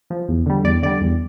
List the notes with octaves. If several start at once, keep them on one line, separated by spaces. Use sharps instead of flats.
F3
E2
D3 G3
E2 D5
D3 G3 D5
E2